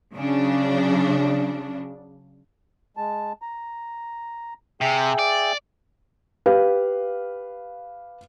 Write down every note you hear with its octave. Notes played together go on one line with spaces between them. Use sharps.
C#3 F#3 D4
G#3 A5
A#5
C3 G#4 E5 G5
D5
G4 B4 F5